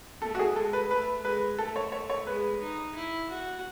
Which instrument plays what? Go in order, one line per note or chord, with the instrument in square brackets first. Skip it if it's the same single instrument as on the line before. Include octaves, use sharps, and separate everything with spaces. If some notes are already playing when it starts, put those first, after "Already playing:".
[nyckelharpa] A3 [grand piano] A4
[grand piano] F#4
G#4
[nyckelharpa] G#3 [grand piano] A4
[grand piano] B4
[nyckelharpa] A3 [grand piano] B4
[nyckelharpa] G#3 [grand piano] B4
[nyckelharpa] A3 [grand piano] A4
[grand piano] C#5
C#5
C#5
[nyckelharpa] G#3 [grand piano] B4
[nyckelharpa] D#4
E4
F#4